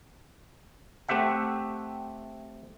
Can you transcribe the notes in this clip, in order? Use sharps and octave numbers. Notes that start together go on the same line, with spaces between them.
A3 C4 G4 E5 F#5